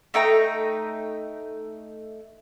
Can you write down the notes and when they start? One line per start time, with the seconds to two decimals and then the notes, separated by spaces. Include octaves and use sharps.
0.14 A3 D#4 G5 A#5